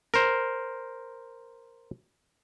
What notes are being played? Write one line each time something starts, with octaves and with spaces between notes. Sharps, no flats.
A#4 C5